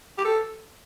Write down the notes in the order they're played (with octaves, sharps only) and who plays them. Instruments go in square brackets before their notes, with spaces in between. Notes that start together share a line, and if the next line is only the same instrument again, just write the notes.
[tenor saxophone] G4
A4